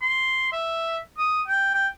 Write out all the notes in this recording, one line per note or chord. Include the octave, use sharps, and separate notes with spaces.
C6
E5
D#6
G5
G5